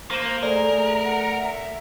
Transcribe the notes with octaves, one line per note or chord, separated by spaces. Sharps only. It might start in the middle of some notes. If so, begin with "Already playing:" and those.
A#3 C5 A#6 D#7 E7
A3 G#4 A#4 D5
F#5
E5